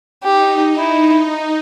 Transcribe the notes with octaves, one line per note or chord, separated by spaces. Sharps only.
D#4 G4
E4
D#4